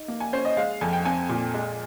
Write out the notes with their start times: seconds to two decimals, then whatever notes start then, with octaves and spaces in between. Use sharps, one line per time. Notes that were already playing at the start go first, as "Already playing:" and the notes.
Already playing: D#4
0.08 A#3
0.20 G#5
0.33 C#4 C5
0.45 D#5
0.57 G#3 F5
0.81 F2 G#5
0.93 G5
1.05 C4 G#5
1.29 A#2
1.54 G#3